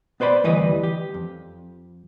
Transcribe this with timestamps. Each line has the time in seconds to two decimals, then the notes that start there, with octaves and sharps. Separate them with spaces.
0.20 B3 B4 C5 D5 B5
0.44 D2 E3 G3 B4 D#5
0.83 G4
1.14 F2